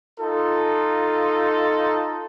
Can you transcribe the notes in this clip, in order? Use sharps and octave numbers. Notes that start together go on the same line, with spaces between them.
D#4 F4 A4